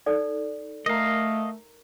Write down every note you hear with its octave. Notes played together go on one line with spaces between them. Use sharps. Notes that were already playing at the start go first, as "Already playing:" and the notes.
D#4 A4 D5
A3 A#4 D#5 F5 A#5